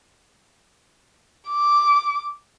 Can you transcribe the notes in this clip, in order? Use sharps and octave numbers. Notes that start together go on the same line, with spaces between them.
D6